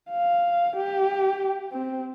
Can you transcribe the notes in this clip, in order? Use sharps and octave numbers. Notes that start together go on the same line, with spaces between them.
F5
G4
C4